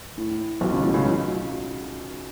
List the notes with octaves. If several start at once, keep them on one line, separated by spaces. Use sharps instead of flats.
A2
B1 B2
C#2 C#3
A2
C#2 C#3
F#3